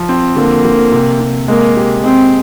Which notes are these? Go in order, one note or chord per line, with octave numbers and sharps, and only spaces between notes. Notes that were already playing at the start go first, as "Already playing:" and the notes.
Already playing: F3
C4
D3 A#3
D3
C3
C3
G#3 A#3
G4
G#3 C4